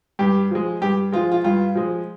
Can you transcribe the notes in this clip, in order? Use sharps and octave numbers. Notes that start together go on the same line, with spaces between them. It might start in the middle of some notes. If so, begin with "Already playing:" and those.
G2 G4
F3 G#3
G2 G4
F3 G#3 F4
F4
G2 F4
F3 G#3